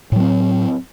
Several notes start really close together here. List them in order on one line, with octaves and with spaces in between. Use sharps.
A2 F#3 C4